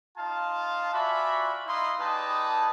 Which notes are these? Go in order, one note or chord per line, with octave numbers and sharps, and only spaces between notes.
D#4 F4 F5 A5
F4 F#4 D5 E5 G#5 B5
D#4 E4 D#5 F5 C6
G3 D#4 G#4 B4 A5